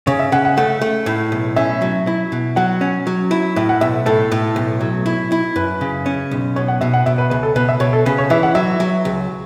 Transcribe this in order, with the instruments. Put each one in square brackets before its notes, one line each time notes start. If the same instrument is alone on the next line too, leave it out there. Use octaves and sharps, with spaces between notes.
[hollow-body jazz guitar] C#3 [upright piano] C#5
[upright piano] E5
[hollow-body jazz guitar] C#3 [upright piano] F#5
[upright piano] F#5
[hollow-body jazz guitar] A3 [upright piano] F#5
[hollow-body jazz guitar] A3
A2
B1
[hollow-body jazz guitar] C#4 [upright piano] E5
[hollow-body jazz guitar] F#3
E4
B2
[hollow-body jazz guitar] F#3 [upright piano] F#5
[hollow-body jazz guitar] C#4
F#3
E4
[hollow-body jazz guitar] A2 [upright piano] E5
[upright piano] F#5
[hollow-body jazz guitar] B1 [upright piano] E5
[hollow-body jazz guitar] A2 [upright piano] A4
[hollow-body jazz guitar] A2
B1
F#3
E4
E4
[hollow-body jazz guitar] F#2 [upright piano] B4
[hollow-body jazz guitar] C#3
C#4
B1
[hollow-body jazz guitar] B2 [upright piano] C#5
[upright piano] F#5
[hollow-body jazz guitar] B2 [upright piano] E5
[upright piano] F#5
[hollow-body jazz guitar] B2 [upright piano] E5
[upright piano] B4
[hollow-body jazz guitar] C#2 [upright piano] B4
[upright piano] A4
[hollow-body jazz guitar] B2 [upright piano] B4
[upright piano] E5
[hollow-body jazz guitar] B2 [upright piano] C#5
[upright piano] A4
[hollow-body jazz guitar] C#3 [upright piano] B4
[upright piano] C#5
[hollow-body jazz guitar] E3 [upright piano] E5
[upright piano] F#5
[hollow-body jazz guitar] F#3 [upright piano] E5
[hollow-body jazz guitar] F#3
C#2